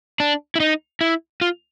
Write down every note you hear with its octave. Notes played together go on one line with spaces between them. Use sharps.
D4
E4
D#4
E4
F4